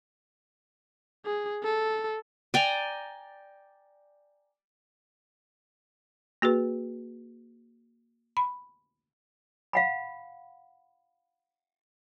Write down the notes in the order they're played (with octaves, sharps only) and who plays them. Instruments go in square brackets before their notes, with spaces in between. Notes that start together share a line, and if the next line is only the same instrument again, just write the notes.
[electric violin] G#4
A4
[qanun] D5 G5 G#5 A#5
[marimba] A#3 F#4 G#4 B4
B5
[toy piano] F5 F#5 B5